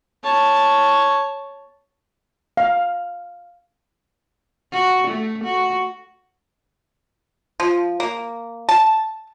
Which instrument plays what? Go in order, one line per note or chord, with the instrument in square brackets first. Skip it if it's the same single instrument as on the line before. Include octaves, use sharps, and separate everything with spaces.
[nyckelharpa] C#5 A5
[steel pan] F5
[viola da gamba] F#4
A3
F#4
[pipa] F3
A#3
A5